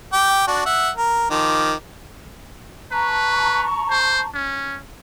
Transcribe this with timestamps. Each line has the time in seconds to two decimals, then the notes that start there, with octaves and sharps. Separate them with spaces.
0.13 G5 D6
0.48 D4 F#4
0.66 E5 F#5
0.97 A#4
1.31 D#3 F3 D6
2.92 B4 A5 A#5 C#6
3.90 C5
4.34 C#4